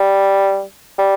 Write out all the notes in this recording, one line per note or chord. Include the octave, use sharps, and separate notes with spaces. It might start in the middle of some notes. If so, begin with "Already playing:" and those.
Already playing: G3
G3